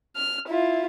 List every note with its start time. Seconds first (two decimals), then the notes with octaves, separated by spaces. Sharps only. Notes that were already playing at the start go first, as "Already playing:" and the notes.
0.16 F6
0.48 E4 F4